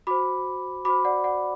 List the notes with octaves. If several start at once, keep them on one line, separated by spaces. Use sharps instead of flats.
F#4 C5 B5 D6
F#4 C5 B5 D6
D5 F#5
D5 F#5